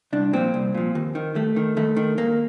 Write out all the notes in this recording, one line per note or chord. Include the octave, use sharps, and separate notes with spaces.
C2 D4
A#2 F3 C4
C2
A#2 F3
D#2
D#3
D#2 A3
D#3
D#2 A3
D#3
D#2 A#3